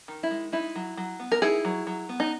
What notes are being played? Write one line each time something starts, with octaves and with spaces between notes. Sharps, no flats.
D#3
E4
G#3
D#4 E4
F#3
F#3
B3
A#4
D#4 E4 G#4
F#3
F#3
B3
D#4